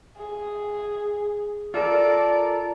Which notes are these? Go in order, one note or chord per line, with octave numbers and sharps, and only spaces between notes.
G#4
F4 A4 A#4 D5